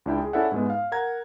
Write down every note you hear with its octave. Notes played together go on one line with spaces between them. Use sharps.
C#2 D4 E4 G5
G#4
C#4 E4 A4 D5 E5 F#5
G#2 G#3 B3
F5
A#4 F#5 A#5 G#6